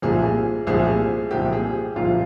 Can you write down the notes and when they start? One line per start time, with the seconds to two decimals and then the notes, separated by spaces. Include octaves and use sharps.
0.02 C2 A#2 F3 G#4
0.67 C2 A#2 F3 G#4
1.31 C2 A#2 F3 G4
1.53 G#4
1.95 C2 A#2 F3 F4